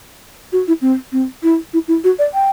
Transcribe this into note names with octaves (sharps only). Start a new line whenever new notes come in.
F#4
E4
C4
C4
E4
E4
E4
F#4
D5
G5